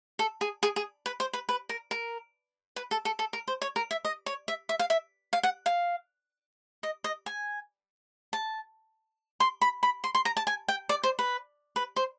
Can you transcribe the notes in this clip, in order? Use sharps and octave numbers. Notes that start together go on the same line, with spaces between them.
A4
G#4
G#4
G#4
B4
C5
B4
B4
A#4
A#4
B4
A4
A4
A4
A#4
C5
C#5
A#4
E5
D#5
C#5
E5
E5
F5
E5
F5
F#5
F5
D#5
D#5
G#5
A5
C6
B5
B5
C6
C6
A#5
A5
G#5
G5
D5
C5
B4
B4
C5